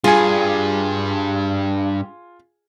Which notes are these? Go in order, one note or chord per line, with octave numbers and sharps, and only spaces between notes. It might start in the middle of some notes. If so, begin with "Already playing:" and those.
G2 F4 G#4 G#5